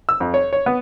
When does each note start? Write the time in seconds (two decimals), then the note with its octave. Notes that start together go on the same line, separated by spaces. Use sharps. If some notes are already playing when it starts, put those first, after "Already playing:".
0.09 E6
0.20 F2
0.34 C#5
0.53 C#5
0.66 B3